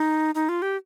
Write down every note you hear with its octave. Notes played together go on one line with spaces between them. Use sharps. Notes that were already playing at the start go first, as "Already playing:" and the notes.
Already playing: D#4
D#4
F4
G4